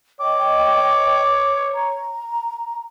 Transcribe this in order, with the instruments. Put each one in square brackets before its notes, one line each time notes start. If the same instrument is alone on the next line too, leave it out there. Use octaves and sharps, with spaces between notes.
[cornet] C#5 [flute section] D#5 G5 [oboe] D6
[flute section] A#5